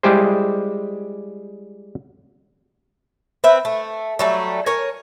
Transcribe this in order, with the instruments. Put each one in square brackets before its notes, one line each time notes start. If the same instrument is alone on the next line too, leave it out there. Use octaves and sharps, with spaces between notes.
[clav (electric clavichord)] G3 G#3 E4 G4 G#4 C5
[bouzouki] C4 B4 E5
A3
F#3 G3 A3
A#4 C#5 G#5